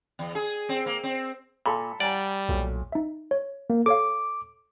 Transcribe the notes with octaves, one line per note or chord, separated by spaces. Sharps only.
E2
G#4
C4
A#3
C4
A#2 A4 B5
G3 D5 F#5 G#5 A#5
B1 A#2 F#3 A3
D#4 E5
C#5
A#3
A4 C#5 F5 D6